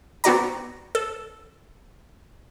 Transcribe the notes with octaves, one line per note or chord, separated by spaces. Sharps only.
B3 C4 F#4 D5 A#5
A4